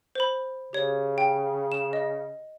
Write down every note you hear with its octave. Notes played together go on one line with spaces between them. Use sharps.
C5 B5
C#3 G4 C#5
G5
E7
D#5